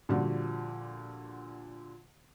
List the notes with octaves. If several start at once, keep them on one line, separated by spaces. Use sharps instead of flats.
A#2 D3 F3 G3 F#4